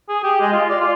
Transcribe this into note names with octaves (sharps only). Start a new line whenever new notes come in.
G#4
G4
G#3
F4
D5
F4